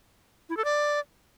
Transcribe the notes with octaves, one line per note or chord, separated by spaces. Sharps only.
E4
A4
D5